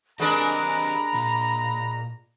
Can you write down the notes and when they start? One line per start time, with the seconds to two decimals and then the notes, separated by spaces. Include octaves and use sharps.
0.20 G#3 D4 G4 A#4 B4 D#5 A#5 B5
1.14 A#2